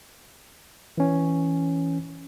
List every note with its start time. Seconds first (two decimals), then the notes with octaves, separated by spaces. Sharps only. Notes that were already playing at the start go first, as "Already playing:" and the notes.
0.98 E3 C#4